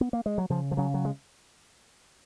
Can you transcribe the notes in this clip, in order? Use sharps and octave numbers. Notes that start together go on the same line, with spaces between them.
B3
A#3
G#3
F#3
C#3 F3
F3
C#3 F#3
F#3
G#3